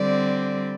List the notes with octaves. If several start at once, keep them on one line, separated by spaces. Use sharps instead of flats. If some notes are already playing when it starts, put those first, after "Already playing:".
Already playing: D3 G3 C4 D5